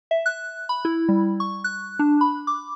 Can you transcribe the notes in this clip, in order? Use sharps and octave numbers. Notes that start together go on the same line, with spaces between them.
E5
F#6
B5
E4
G3
C#6
F#6
D4
B5
D6